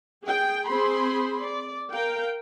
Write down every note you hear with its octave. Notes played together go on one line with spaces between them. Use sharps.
G#4 G5
C4 G#4 C5 B5 C6
D5
A#4 F5 G5